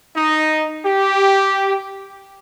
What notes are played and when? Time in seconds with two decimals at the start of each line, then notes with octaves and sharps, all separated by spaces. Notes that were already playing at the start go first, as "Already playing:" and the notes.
0.16 D#4
0.84 G4